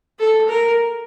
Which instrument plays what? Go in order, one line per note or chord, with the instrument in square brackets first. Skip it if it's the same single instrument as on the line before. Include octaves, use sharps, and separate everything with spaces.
[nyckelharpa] A4
A#4